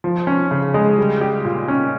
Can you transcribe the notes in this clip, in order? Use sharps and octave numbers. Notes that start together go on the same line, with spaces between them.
F3
C#4
C#3
G#3
G3
G4
A#2
C#4